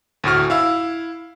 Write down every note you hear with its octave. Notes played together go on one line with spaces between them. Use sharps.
D2 A2 F#4 F6
E4 F5 E6